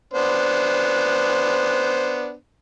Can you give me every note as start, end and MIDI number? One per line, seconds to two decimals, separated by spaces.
0.14 2.33 59
0.14 2.33 62
0.14 2.33 72